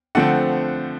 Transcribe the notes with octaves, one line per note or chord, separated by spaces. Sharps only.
D3 F3 A3 C4 F#5